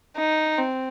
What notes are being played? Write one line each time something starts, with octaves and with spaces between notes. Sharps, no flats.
D#4
C4